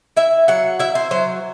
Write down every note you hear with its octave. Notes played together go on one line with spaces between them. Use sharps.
E4 E5
F#3 F#5
E4 E5
C5
F#3 C5